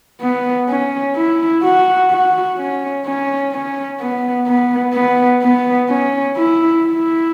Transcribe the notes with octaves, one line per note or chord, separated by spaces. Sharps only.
B3
C#4
E4
F#4
F#4
C#4
C#4
C#4
B3
B3
B3
B3
C#4
E4
E4